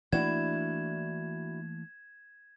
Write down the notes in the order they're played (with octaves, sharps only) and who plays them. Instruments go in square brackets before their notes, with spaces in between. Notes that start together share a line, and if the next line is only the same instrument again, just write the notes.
[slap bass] E3 A3 A#3 [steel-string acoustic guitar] D4 E4 F#4 [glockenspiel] G#6 E7